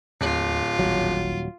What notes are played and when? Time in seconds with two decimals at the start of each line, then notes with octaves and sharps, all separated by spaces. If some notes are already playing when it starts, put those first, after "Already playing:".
0.21 D1 D#2 F4
0.79 D#1 G#1 F#3